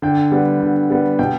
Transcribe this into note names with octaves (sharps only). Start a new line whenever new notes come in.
D3 G5
G3 B3
D3
G3 B3
B2 G5